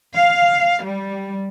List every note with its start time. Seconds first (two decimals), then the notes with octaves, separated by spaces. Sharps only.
0.14 F5
0.84 G3